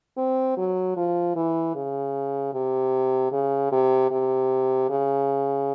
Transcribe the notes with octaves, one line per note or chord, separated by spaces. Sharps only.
C4
F#3
F3
E3
C#3
C3
C#3
C3
C3
C#3